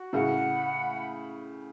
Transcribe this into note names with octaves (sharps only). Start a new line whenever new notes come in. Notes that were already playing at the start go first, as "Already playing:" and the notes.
Already playing: F#4
A2 C#3 F#5
B5